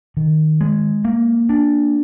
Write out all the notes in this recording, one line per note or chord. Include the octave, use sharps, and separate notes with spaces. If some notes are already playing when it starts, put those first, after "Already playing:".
D#3
G#3
A#3
D4